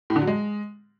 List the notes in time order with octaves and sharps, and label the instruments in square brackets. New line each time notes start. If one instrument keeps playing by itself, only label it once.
[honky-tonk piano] A2
D3
F#3
G#3